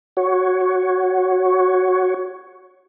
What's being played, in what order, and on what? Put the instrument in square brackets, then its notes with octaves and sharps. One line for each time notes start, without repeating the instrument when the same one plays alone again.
[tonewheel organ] F#4 C#5